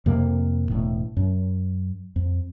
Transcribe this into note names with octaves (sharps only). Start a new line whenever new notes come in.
F2 C3 A#3
E1 A2
F#2
F2